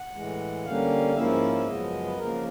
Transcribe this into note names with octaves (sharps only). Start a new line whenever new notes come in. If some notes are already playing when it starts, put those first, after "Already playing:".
Already playing: F#5
A2 E3 G#3
D3 G3 A#3 C#4 F5
G#2 F3 A#3 C#4 E4 E5
F#2 C#3 F3 G#3 B3 D#5
B4
C#3 F3 A#3 A#4